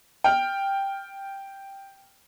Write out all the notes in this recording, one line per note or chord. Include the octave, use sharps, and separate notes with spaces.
G5 F6